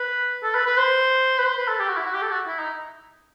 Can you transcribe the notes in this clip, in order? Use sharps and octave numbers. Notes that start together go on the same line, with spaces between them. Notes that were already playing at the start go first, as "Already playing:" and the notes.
Already playing: B4
A4
B4
B4
C5
B4
C5
B4
A4
G4
F#4
E4
F#4
G4
A4
F#4
E4
D#4